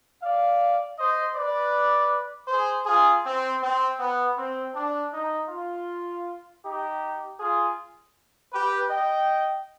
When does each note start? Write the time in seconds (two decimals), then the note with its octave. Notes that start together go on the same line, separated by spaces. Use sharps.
0.22 D5 F5
0.98 C5 D#5
1.35 B4 D5
2.48 G#4 C5
2.86 F4 G#4
3.25 C4
3.61 C4
3.99 B3
4.36 C4
4.75 D4
5.13 D#4
5.49 F4
6.63 D#4 G4
7.39 F4 G#4
8.52 G4 B4
8.89 D#5 G5